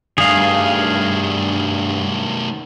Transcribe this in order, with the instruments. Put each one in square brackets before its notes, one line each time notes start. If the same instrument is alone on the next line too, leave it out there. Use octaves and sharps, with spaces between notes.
[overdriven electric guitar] G2 [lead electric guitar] D#3 A3 [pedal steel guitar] G#4 F5